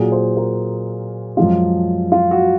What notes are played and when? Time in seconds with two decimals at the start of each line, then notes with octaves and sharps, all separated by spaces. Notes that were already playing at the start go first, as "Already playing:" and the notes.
Already playing: A#2 F#3 G#4
0.12 C5
0.37 A#4
1.37 F#2 F3 G#3 F4
2.12 F4
2.31 F#4